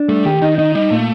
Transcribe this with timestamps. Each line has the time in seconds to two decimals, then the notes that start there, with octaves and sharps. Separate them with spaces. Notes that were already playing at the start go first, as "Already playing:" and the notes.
Already playing: D4
0.08 G3 A3
0.25 D#3 G4
0.42 D#3 D#4
0.58 D#3 D#4
0.75 G3 D#4
0.90 A#2 A3